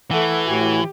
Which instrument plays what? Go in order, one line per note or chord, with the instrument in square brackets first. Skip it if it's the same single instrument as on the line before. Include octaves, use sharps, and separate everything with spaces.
[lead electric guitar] E3 [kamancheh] A3 F#5
[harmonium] A2 F#4 G#5 [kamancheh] G4